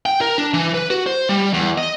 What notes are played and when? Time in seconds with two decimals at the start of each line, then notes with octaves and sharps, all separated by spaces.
0.06 G5
0.21 A#4
0.38 D4
0.54 E3
0.74 B4
0.90 F#4
1.06 C5
1.29 G3
1.54 E2
1.78 D#5